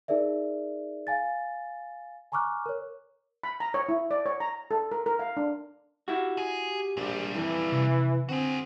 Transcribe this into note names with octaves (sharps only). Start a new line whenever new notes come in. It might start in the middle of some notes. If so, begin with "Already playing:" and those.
D#4 G#4 A#4 D5 E5
F5 G#5 A6
G#5 A#5 C#6 D6 F6 F#6
A#4 C#5
B5
A#5
C#5
E4
D5
C#5
A#5
A4
A#4
A#4
F5
D4
E4 F#4 G4
G#4
A#1 A#2 G3
F2 E3
C3
D3 C4 F#4 G#4